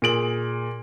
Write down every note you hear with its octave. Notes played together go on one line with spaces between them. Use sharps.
A#2 G#4 D7 F#7